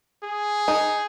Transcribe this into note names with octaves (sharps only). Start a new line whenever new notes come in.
G#4
D#4